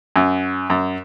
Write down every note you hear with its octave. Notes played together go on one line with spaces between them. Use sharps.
F#2
F#2